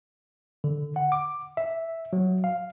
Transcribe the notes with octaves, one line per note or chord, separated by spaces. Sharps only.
D3
F#5
D6
E5
F#3
F5